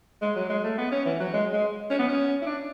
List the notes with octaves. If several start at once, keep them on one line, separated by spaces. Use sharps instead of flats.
G#3
F#3
G#3
A3
B3
C#4
E3
F#3
G#3
G#3
C#4
B3
C#4
E4
D4